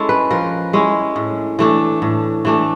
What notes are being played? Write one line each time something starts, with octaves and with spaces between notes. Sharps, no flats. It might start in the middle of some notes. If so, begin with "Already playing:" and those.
Already playing: G#3 C#4 E4 A4
B4
F3 A#4
G#3 C#4 E4
A2
E3 A3 D4
A2
E3 A3 D4